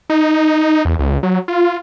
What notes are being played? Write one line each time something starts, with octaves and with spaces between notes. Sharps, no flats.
D#4
E2
C#2
F#3
F4